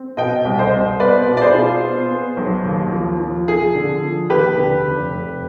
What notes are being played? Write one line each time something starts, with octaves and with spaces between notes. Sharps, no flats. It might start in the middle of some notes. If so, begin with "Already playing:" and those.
Already playing: C4
B2 D#5 G5
C2
C5 D#5
C2
B3 B4 D5
B2
D5
G#4 C5
F4
B3
B3
B1
D#2
F3
F3
F3 G#4
D3
F3
D#2 G4 B4
D3
F1
F1